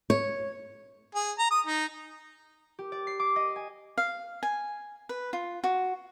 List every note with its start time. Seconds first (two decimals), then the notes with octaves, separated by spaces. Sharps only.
0.10 C#5
1.15 G#4
1.39 A#5
1.51 D#6
1.66 D#4
2.79 G4
2.92 D5
3.07 C7
3.20 D6
3.36 D#5
3.56 G#5
3.98 F5
4.43 G#5
5.09 B4
5.33 F4
5.64 F#4